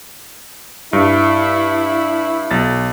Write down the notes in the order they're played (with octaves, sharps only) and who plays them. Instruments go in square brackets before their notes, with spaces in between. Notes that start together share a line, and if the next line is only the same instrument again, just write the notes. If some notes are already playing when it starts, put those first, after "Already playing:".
[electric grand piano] G2 [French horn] E4
[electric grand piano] B1 A6